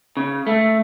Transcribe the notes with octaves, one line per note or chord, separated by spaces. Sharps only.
C#3
A3